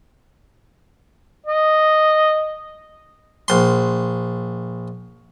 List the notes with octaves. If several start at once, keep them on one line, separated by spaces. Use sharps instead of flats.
D#5
A#1 C6